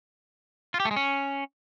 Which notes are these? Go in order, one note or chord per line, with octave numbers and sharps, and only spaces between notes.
F4
G4
A3
G#3
C#4